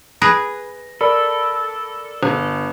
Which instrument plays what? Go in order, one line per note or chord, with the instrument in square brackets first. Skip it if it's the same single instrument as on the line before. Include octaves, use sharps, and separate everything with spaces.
[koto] G#4 B4 [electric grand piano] A#6
[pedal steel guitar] A4 [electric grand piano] A#4 D5 B5
[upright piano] G1